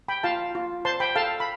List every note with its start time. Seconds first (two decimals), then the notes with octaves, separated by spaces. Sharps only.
0.08 G5 B5
0.23 F4 F5 A5
0.55 F4
0.85 C5 A5 C6
1.00 G5 B5
1.16 A4 F5 A5
1.40 B5